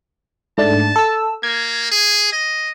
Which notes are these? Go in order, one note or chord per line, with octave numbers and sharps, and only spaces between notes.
G#2 A3 D4 A5
A4 E6
A#3 G#6
G#4
D#5